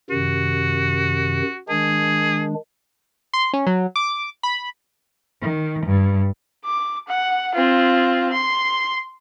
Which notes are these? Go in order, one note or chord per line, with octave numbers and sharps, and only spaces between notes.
F#2 C3 D#3 F#4
D#3 G#3 D4 G#4
C6
C#4
F#3
D6
B5
D#3
G2
D6
F#5
C4 F4
C6